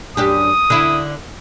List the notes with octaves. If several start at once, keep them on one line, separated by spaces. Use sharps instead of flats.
F#2 D4 G4 D#6
D3 E4